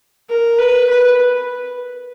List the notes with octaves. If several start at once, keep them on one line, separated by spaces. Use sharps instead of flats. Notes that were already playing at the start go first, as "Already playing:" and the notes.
A#4
B4
B4